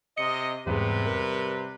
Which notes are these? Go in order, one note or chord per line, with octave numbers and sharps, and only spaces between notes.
C3 D#5 C#7
E2 G#2 C3 G3 G#4 B4
A#4